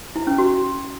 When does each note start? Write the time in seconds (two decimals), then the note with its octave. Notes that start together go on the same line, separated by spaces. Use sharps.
0.16 E4
0.27 C#4
0.38 F#4